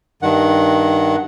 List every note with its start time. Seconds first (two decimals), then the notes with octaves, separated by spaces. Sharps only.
0.22 G2 D#3 F#5